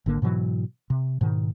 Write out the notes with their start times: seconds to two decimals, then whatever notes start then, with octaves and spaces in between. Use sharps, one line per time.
0.06 G#1 D3 A#3
0.22 G#2 B2 E3 F#3
0.90 C3
1.21 G#2 B2 D#3